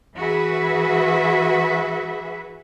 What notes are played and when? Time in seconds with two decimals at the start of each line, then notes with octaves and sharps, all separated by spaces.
0.16 E3 F#4 G#4 B4 E5